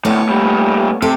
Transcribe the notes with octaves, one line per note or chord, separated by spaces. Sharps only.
D2 A2 A3 B3 C#5
A#2 G3
C3 A4